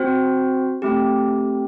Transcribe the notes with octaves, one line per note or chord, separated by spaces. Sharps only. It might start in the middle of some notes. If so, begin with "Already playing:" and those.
Already playing: C4 F#4 C5
A3 C4 G4